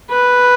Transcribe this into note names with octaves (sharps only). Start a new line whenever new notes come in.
B4